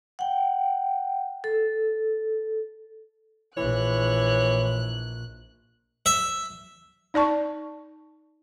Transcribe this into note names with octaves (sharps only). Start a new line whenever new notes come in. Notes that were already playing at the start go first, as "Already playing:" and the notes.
F#5 G5
A4
A#1 E3 C#5 F#6
E5
D#4 D5 A5 C#6